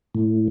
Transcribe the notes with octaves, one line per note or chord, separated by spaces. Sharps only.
A2